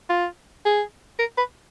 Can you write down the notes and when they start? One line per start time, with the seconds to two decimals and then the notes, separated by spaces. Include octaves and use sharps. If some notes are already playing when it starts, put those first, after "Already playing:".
0.10 F4
0.65 G#4
1.19 A#4
1.37 B4